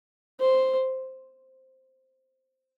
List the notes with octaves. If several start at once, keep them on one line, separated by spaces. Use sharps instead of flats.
C5